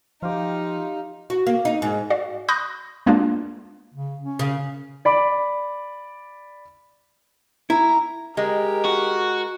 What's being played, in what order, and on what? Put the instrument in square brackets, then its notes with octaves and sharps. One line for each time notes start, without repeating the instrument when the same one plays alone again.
[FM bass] F3 [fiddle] D#4 [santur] F4 G4
[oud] F#4
A#3
D#4
G#2
[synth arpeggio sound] F#4 D5 F5
B5 C#6 D#6 F#6 G6 A#6
G#3 A#3 B3 D4 F4
[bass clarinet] C#3
C#4
[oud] C#3
[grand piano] D5 B5 D6
[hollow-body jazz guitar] E4 [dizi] A#5
[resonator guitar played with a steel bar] G#3 [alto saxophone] G4 [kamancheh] A#4
[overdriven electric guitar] F#4